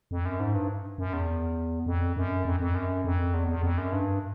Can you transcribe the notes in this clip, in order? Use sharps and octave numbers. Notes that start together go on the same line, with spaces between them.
F2
F#2
G#2
G2
F#2
E2
F2
F#2
F2
F2
F#2
F2
E2
E2
F2
F#2
G2